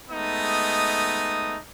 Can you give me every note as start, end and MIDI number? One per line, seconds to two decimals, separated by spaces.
0.10 1.56 56
0.10 1.56 57
0.10 1.56 59
0.10 1.56 63
0.10 1.56 87